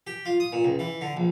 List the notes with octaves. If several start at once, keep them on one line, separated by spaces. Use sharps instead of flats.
G4
F4
D#6
A#2
C#2
E3
D3
A#1